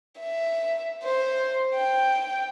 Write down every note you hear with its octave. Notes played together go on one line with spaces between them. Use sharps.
E5
C5
G5